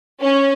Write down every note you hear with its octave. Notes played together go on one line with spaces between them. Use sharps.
C#4